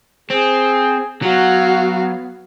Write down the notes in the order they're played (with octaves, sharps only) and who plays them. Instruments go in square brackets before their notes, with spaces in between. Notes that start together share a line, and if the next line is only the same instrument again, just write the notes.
[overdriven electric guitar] C4 [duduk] G#4
[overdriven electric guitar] F#3 [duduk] B3 [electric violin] F#4 F5